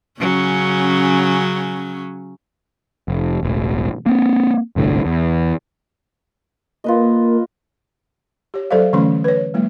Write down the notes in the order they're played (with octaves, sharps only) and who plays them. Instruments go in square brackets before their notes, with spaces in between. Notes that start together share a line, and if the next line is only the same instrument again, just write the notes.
[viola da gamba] C#3 F#3 C#4
[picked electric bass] F1
E1 A1
A#3 C4
G1 C2 A2 D3
E2
[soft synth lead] A#3 [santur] F4 B4 D#5
[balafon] G4 C#5
F#3 A4 C5 D5 F5
D3 E3 F#3 A3 C#4 C6
B4 C#5
F#3 G#3 A#3